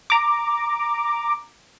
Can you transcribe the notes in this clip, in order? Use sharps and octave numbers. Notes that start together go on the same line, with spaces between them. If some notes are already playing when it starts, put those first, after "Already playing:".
A#5 D6